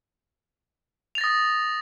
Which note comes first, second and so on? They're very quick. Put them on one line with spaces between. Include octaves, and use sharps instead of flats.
F7 A6 A#6 D#6